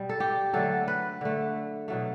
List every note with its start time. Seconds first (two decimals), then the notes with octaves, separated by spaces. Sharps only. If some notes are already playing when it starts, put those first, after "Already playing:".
Already playing: B2 G3
0.09 A4
0.20 G4
0.53 D3 F#3 A3 A4
0.88 B4
1.21 D3 A3
1.88 B2 F#3 A3